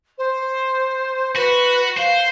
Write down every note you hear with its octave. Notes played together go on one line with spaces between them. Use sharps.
C5
F#4 B4
C5 F5